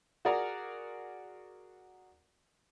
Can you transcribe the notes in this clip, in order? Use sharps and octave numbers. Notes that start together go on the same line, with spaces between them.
F#4 G#4 A#4 D5 F#5 A#5